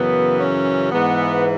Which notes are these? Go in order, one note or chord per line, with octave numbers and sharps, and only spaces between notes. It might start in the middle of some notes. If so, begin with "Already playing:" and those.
Already playing: F#2 C#3 E3 B3
C#4
G#2 E3 B3